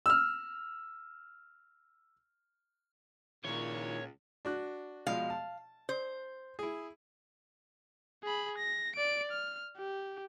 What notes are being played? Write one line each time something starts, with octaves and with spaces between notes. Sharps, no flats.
E6 F6
C#2 A#2 D#3 E4 C#5
D4 F#4 F#6
B2 F3 G#3 F5
A5
C5
E4 G#4
G#4 B5
A#6
D5 D7
F6
G4